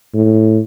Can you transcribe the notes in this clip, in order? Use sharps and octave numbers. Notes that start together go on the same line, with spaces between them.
A2